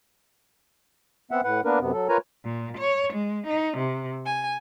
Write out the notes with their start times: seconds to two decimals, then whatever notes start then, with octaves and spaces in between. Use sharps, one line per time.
1.31 B3 C4 E5 F#5
1.44 A2 B4 F#5
1.65 A#3 B3 D4 A#4 B4
1.80 F#2 C3 B3
1.92 F#3 A4
2.09 F4 A#4 B4 C#5 G#5 A#5
2.44 A#2
2.77 C#5
3.14 G#3
3.46 D#4
3.77 C3
4.25 G#5